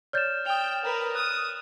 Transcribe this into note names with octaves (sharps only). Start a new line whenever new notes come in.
C#5 D5 F6 G6 A6 E7
G5 D#6 F7
A#4 B4
D#6 F6 F#6